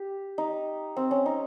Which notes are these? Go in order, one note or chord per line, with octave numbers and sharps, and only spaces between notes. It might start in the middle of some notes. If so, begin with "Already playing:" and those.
Already playing: G4
D#4
C4
C#4
D#4